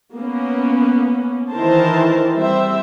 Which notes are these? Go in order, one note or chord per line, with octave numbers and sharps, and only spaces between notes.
A#3 B3 C#4
D#3 E3 A#4 C5 A5
G3 C4 C5 E5